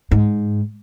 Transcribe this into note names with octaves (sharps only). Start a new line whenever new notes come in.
G#2